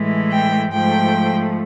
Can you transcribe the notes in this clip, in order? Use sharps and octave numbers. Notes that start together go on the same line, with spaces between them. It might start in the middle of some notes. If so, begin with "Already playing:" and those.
Already playing: A2 E3 G#3
G5
G#2 F3 A3 G5